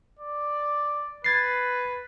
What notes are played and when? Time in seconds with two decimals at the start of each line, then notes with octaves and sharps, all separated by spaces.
0.19 D5
1.24 B4 G#6 A6 C7